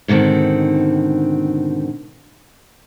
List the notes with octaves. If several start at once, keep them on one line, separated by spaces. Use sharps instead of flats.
G#2 B2 D3 D#3 C4